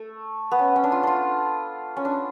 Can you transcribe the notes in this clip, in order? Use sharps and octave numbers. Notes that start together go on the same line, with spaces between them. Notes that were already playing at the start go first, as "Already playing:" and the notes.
Already playing: A3
B3
C#4
C#4
D4
F4
D4 F4
C#4
D4